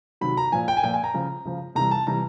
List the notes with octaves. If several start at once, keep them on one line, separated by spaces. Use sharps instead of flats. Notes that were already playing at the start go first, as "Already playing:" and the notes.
C3 D#3 F#3 B5
A#5
A#2 F3 G#5
G5
G#5
A#2 F3 G5
G#5
A#5
C#3 F3
C#3 F3
C3 E3 G3 A#5
A5
C3 E3 G3 A#5